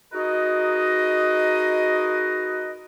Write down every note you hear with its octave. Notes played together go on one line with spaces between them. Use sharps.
D#4 F#4 G#4 A#4 B4 D#5